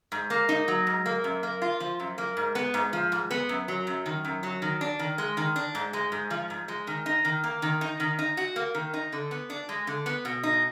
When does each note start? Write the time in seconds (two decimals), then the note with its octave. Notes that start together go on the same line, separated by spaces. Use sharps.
0.12 G#2
0.30 A#3
0.49 D#4
0.68 F#3
0.87 G#2
1.06 A#3
1.24 F#2
1.43 A#3
1.62 F4
1.80 F3
2.00 F#2
2.18 A#3
2.37 G#2
2.55 B3
2.74 G#2
2.93 F3
3.12 G#2
3.31 B3
3.49 F#2
3.68 F#3
3.87 F#2
4.06 D#3
4.25 F#2
4.43 F#3
4.62 D#3
4.81 D4
4.99 D#3
5.18 G#3
5.37 D#3
5.56 D4
5.75 G#2
5.93 G#3
6.12 G#2
6.30 F3
6.50 G#2
6.68 G#3
6.87 D#3
7.06 D#4
7.25 D#3
7.44 A#3
7.62 D#3
7.81 D#4
8.00 D#3
8.19 D#4
8.37 F#4
8.56 A#3
8.75 D#3
8.94 D#4
9.12 D3
9.31 B3
9.50 D4
9.69 G#3
9.87 D3
10.06 B3
10.25 B2
10.43 D#4